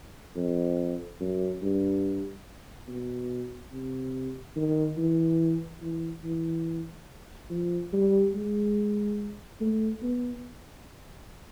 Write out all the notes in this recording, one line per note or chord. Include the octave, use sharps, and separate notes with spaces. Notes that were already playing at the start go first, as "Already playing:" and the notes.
F2
F#2
G2
B2
C3
D#3
E3
E3
E3
F3
G3
G#3
A3
B3